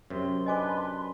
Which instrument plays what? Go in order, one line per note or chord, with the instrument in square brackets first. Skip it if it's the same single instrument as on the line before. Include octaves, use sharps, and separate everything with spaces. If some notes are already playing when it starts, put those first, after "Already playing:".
[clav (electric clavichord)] F#2 C3 [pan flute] C6
[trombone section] D4 B4 [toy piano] D#5 G#5 D6